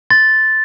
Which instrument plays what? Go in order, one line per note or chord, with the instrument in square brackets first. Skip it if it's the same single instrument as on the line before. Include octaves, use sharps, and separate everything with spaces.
[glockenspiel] C6 A6